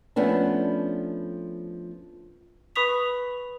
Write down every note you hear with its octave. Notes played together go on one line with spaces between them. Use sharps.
F3 A3 B3 C#4 D4
B4 B5 C#6 D#6 B6 F7